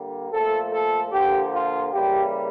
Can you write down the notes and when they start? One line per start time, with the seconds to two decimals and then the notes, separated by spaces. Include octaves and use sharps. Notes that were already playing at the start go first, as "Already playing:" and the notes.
Already playing: D3 G3 A#3
0.31 A#2 F3 A3 A4
0.72 A4
1.11 D3 F3 A#3 G4
1.52 F4
1.92 C#3 E3 G3 A#3 G4